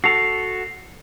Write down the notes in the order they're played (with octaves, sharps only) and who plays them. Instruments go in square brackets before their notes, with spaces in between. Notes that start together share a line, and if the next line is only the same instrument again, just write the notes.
[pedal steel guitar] F#4 A4 [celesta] C7 F7